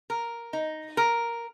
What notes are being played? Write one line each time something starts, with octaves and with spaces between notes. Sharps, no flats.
A#4
D#4
A#4